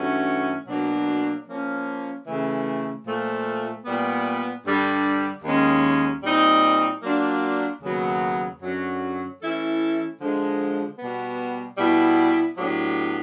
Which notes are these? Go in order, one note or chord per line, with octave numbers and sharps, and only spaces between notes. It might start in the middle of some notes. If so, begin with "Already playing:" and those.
Already playing: G2 E3 A3 C#4 F#4
B2 F#3 A#3 D4
F3 A#3 C#4
C#3 E3 A3
A#2 F3 A3
A#2 G3 B3
G2 D3 G3
D#2 D#3 G#3 C#4
A#2 G3 C4 D#4
F#3 A#3 D4 F4
D#2 C#3 F#3 B3
F#2 D3 F#3
E3 A3 C#4 E4 A4
D3 F3 G#3
B2 G3 B3
B2 G3 B3 E4
A2 F#3 B3 D4 G4